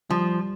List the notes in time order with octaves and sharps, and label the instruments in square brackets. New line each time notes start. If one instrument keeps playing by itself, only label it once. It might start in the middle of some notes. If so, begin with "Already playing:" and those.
[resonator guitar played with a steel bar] F3 [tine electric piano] G3